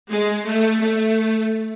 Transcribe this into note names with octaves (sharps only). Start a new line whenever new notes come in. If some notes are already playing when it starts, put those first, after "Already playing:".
G#3
A3
A3